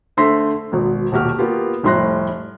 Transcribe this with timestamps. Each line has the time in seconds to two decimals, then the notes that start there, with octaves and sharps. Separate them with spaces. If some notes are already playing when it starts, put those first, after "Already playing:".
0.17 D3 A3 C5 C6 A#6 B6
0.72 G#1 B2
1.12 D#1 B2 F#4 G4 F6
1.39 A#3 B3 F4 G4
1.83 F1 A2 G3 C6 F#6 A#6